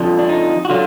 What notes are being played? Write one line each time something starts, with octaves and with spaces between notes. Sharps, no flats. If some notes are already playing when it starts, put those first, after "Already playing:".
Already playing: F2 D3 F3
D4
D#4
F#4
D3 F#3 F4